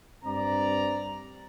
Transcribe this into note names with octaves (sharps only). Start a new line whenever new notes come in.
G2 C4 D5 A#5